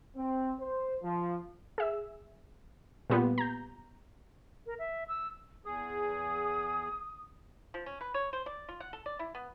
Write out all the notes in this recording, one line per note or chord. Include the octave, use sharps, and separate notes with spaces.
C4
C5
F3
G#4 E5 E6
A#2 G3 B3 F4 G4
A#5 G6
A#4
E5
E6
E2 G#4 D#6
F3
C#4
B4
C#5
C5
D5
F4
F#5
A4
D5
E4
B3